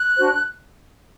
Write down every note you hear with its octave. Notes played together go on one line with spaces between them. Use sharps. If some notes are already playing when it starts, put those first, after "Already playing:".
Already playing: F#6
D4 F#4 C5